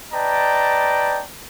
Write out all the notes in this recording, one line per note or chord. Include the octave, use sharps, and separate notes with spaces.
B4 D5 D#5 G5 A5 A#5